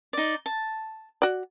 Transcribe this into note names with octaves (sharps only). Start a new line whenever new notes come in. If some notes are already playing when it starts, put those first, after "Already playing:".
D#4 D5
A5
F#4 D5